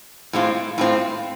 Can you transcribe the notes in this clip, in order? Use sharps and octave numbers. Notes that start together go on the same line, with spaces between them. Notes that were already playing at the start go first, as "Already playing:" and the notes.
A2 G#3 C4 F4
A2 G#3 C4 F4